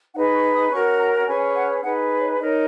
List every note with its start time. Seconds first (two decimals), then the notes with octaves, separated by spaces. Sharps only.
0.15 D#4 G#4 B4 F#5
0.34 C#6
0.53 D#6
0.71 C#4 F#4 A#4 C#6
0.99 A#5
1.27 C#4 G#4 B4 G#5
1.55 F#5
1.83 D#4 G#4 B4 F#5
2.20 C#5
2.39 D#4 A#4 C#5 D#5